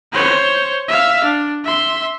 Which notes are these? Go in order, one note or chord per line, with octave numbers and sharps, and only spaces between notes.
C5 C#5
E5 F5
D4
E5 C6